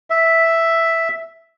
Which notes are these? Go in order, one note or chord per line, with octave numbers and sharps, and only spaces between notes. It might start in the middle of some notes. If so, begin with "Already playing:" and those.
E5